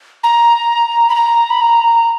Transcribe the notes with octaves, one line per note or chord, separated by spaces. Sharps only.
A#5
B5
A#5
B5
A#5